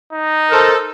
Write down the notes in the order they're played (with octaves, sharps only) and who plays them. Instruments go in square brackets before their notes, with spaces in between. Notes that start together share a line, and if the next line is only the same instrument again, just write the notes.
[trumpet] D#4
[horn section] A4 [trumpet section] A#4 C5